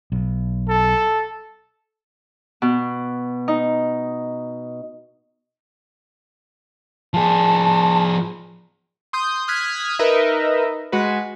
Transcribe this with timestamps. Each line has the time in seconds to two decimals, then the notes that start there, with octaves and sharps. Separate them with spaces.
0.12 B1
0.69 A4
2.62 B2
3.48 D#4
7.14 F3 G#4 A5
9.13 C6 D#6 G6
9.48 D#6 F6 F#6 G#6 B6
9.99 D#4 A#4 B4 D#5 E5
10.92 G#3 F#4 B4